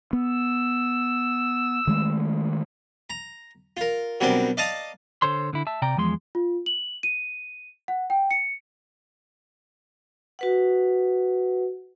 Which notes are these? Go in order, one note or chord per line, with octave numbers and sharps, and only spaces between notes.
B3 E6
D#3 G#3 A3
A#5
F4 A#4
B2 F#3 G3 C4 D4 A#4
D5 D#5 F5 A5 A#5 D#6
D3 A4 C5 C#5 C6
D3 E4
E5 A5
C3 D5 G5 A#5
E2 F3 G#3 C6
F4
F#7
D#7
F#5
G5
C#7
F#4 B4 F#5